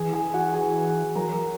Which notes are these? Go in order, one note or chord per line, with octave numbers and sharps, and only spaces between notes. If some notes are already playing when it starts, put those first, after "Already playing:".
Already playing: E3 G#4 G#5
G#4 G#5
F#4 F#5
G#4 G#5
F#3 A#4 A#5